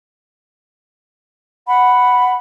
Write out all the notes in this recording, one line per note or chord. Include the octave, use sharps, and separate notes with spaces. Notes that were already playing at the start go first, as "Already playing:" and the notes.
F#5 B5